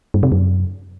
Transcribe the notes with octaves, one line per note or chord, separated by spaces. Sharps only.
G2
C3
F#2